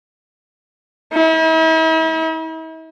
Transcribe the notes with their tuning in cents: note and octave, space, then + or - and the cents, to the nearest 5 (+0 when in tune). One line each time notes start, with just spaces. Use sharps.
E4 -45